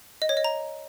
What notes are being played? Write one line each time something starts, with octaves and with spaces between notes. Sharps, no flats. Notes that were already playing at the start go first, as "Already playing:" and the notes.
D#5
C#5
D#5
A#5